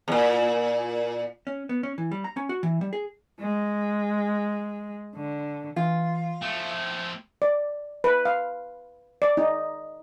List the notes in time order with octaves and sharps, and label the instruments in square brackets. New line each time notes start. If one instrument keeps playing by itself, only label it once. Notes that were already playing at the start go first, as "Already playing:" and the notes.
[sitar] E2 A#2
[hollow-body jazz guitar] C#4
B3
C#4
E3
G3
A#5
C#4
F#4
E3
G3
G#4
[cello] G#3
D3
[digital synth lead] E3 [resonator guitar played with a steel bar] F4
[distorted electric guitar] F3 A3 [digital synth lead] G5
[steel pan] D5
B4
F5
D5
D#4